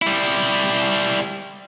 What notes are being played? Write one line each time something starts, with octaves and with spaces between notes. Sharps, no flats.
G3 E4